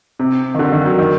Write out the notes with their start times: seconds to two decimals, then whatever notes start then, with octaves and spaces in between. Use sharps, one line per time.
0.19 C3
0.54 D#3
0.59 D3
0.72 D#3
0.86 F#3
0.98 D#3